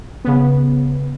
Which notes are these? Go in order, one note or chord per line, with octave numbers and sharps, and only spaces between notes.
C#3 B3